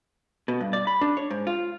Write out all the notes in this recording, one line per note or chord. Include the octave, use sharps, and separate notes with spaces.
B2
G2
D5
B5
D4
C#5
G#2
F4